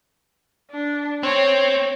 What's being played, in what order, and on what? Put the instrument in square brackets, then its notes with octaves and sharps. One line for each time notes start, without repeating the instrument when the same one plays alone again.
[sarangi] D4
[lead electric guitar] C4 [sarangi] C#5